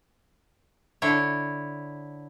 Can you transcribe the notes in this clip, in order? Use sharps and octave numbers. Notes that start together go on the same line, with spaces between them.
D3 E4 C#5